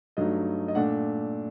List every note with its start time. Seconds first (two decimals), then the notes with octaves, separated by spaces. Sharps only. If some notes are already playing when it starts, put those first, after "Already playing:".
0.17 G2 F#3 A3 D#4 D#5
0.68 D#5
0.75 A#2 A3 D4 F#5